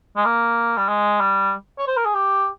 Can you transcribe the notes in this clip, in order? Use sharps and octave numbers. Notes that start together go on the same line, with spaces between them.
G#3
A#3
G3
G#3
G3
C#5
C5
A#4
G#4
G4